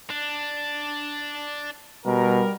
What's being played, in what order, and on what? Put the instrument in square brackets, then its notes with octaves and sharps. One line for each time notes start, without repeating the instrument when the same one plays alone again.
[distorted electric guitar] D4
[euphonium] B2 [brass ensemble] G3 A#4